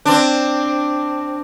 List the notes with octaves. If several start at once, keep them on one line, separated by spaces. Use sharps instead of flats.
C4 D4